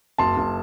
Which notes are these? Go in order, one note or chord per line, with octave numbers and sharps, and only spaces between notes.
F#1 A5 C6
F#1